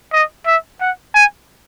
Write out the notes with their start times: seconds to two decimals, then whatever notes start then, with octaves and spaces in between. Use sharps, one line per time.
0.13 D#5
0.46 E5
0.81 F#5
1.14 G#5